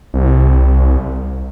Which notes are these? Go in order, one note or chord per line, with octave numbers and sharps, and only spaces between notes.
C2